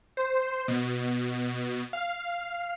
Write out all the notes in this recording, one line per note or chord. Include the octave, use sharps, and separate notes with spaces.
C5
B2
F5